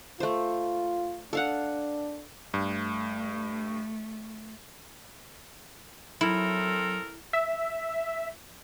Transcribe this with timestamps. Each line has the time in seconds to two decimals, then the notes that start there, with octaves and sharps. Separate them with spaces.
0.20 A3 F4 C5
1.33 D4 A4 F5 F#5
2.54 G2 A3
6.21 F#3 C4 E4 A4 A#4
7.33 E5